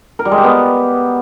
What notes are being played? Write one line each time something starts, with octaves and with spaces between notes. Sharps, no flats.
A#4
G3
G#3
G4
B3